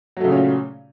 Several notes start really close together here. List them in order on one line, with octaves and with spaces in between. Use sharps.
F#3 A3 C#3 A#2 C#4